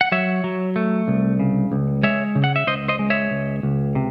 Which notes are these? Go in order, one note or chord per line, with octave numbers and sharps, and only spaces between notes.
F#5
F#3 C#5 E5
F#3
A3
C2
C#3
C#2
G#3 C#5 E5
C#3
F#5
E5
C#2 C5 D#5
C5 D#5
G#3
C#5 E5
C#2
C#2
C3